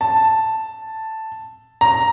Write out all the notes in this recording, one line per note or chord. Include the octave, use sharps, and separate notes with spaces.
A5
A#5